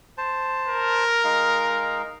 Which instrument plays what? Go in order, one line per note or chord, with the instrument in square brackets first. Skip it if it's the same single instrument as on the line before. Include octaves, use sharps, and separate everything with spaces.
[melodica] C5 A5
[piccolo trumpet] A#4
[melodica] G#3 D#4 F5